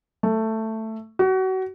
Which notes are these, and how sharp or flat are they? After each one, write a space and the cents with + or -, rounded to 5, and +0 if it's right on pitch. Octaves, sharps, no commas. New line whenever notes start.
A3 +10
F#4 +30